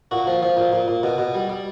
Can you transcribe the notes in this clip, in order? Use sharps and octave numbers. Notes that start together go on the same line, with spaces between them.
A#2 F#4
F3
F3
A#2
A#2
A#2
B2
B2
G3
G3